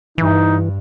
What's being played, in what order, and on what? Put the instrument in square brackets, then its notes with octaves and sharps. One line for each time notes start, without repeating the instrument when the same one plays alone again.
[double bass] G2 [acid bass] E3 [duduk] D#4